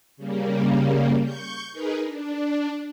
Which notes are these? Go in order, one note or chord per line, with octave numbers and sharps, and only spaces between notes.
C#3 G3 A#3
C#6 G6
D#4 G#4 A#4 B4
D4